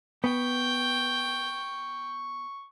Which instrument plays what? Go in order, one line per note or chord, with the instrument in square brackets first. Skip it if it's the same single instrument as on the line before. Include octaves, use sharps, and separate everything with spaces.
[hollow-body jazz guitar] B3 [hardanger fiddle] G5 [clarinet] C#6